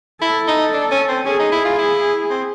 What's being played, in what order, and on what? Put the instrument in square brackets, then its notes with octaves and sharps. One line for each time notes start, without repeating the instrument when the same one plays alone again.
[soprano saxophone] E4 [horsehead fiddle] A4
[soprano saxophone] D#4
D4
C#4
C4
[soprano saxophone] C#4 [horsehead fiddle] G#4
[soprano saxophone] D#4
E4
F4
E4
C4